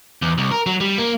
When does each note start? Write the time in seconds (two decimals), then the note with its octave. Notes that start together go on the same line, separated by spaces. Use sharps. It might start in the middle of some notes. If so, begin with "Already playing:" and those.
0.22 E2
0.38 C2
0.52 A#4
0.66 F#3
0.81 G3
0.98 A#3